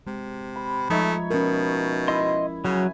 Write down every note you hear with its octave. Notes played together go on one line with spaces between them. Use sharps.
C3 G#3
B5
F3 G#3 A3 D#4 C#5 E5
B2 C#4 A#4
E4 D#5 E5 C6
C#3 F#3 G#5